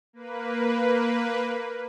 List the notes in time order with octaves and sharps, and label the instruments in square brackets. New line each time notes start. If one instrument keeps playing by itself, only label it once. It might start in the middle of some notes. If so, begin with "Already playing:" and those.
[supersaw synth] A#3 B4